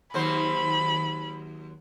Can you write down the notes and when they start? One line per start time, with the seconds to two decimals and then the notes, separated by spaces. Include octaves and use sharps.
0.14 D#2 F#3 C5 B5